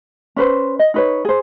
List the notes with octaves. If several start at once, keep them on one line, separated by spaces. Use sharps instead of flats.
C#4 B4 C5
D#5
D#4 B4 C#5
G#4 C5